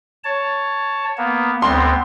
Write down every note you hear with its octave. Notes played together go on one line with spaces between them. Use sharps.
C#5 A5
A#3 B3
D2 B3 C4 C6